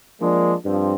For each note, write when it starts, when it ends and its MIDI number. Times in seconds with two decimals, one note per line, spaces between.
0.20 0.53 53
0.20 0.53 56
0.20 0.53 58
0.20 0.53 62
0.65 0.93 43
0.65 0.93 53
0.65 0.93 60